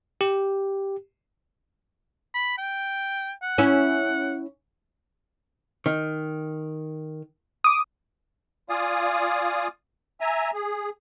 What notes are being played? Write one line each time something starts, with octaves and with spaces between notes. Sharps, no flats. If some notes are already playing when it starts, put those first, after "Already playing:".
G4
B5
G5
F#5
C#4 E4
D#3
D6 D#6
F4 D5 F5 G#5 D#6
E5 G#5 A#5
G#4